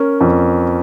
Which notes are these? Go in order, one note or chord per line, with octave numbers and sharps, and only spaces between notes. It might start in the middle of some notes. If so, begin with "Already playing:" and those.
Already playing: C#4 A#4
F2